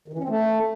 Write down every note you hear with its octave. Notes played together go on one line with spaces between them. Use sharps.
D#3
E3
C#4
C4
A3